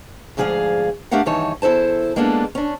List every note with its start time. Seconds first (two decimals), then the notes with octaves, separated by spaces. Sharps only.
0.37 D2 G#2 F3 G#4 D5 F5
1.11 A3 D4 G4 A#4 F5 F#5
1.26 G2 D#3 E3 D#4 C#5 A5
1.62 E2 E4 A4 C5 A5
2.16 G#3 A#3 B3 D4 F#4 A4
2.55 C#4 D4